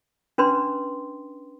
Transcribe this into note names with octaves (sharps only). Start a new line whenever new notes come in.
C#4 D4 B4 G5 C6